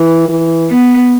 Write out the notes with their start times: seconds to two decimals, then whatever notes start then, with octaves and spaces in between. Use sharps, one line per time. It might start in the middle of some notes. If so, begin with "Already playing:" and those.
Already playing: E3
0.29 E3
0.70 B3